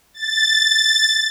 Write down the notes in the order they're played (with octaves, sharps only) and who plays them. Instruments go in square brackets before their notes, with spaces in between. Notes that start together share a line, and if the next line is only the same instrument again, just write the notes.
[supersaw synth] A6